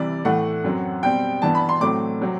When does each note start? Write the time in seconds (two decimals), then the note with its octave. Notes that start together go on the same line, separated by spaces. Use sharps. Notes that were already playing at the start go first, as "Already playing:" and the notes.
Already playing: C3 E3 G3 D5
0.25 A2 E3 A3 F#5
0.64 F#2 F#3 C4
1.03 B2 G3 C4 G5
1.42 G2 E3 B3 A5
1.55 B5
1.69 C6
1.81 A2 F#3 A3 C4 D6
2.21 C3 F#3 C4